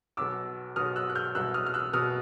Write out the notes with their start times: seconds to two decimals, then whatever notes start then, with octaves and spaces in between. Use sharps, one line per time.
0.17 B1 B2 D6 E6
0.76 B1 B2 D#6 F6
0.96 E6 F#6
1.09 F#6
1.15 F6 G6
1.35 C2 B2 E6 F#6
1.54 D#6 F6
1.66 F6
1.74 E6 F#6
1.93 B2 D#6 F6